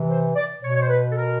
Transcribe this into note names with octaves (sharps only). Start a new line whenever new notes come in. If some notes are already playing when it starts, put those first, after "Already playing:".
Already playing: C3 E3
C5
D5
B2 C#5
C#5
C5
B4
A4
A#4